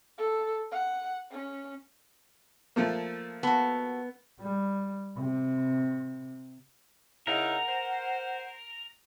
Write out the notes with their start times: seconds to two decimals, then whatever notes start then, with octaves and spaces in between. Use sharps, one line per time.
0.18 A4
0.72 F#5
1.32 C#4
2.76 F3 A3 A#3
3.43 B3 F#4 A4
4.40 G3
5.17 C3
7.27 C#3 D#4 E4 A#4 F#5
7.69 C5